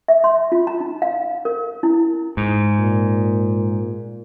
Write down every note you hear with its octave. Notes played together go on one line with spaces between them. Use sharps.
E5
C6
F4
A#5
D#4
F5
A#4
E4
G#2
A#2